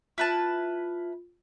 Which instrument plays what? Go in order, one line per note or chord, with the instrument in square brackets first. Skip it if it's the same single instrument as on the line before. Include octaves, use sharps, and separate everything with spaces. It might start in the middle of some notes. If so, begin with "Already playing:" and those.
[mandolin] E4 B4 A5 [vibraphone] F4